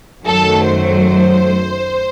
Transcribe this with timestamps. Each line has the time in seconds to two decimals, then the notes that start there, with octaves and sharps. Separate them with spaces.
0.25 F#2 D#3 F#3 A3 A4
0.65 C5